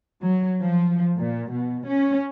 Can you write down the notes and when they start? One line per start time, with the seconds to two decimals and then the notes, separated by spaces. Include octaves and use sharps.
0.22 F#3
0.62 F3
1.17 A#2
1.53 B2
1.87 C#4